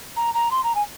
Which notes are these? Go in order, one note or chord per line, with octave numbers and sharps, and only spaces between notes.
A#5
A#5
C6
A#5
G#5